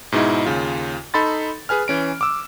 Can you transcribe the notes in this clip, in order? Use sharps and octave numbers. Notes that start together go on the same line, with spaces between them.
G#2 B2 G#3 D#4 E4
D#2 C#3 F4
D#4 A4 B5 C6 A6
G#4 B4 G#5 F6
E3 C#4 D7
D6 E6